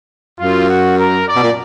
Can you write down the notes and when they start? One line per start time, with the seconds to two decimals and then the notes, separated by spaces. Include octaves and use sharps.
0.39 F#2 F4
0.69 F#4
0.99 A#4
1.29 D5
1.36 B2
1.43 A#2